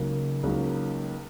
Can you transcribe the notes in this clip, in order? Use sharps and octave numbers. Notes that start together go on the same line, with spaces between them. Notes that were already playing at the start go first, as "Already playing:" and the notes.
Already playing: C#2 C#3 F#3 A#3 D#4
C#2 C#3 F#3 A#3 D#4